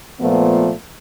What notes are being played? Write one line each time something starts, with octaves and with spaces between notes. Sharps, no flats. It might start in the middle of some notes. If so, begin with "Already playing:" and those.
A#2 F3 A3 B3